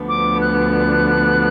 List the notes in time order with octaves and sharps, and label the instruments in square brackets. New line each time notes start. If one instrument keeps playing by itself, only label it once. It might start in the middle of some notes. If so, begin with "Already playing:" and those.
Already playing: [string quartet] D2 D3 F3 B3 D4
[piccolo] D6
F#6